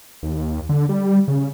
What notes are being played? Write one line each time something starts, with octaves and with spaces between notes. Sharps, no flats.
D#2
D3
G3
C#3